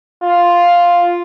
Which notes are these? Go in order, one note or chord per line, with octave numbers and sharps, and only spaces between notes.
F4